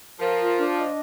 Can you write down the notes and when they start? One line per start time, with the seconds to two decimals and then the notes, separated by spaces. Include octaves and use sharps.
0.19 F3 A#4
0.39 F4
0.58 D4
0.77 D#5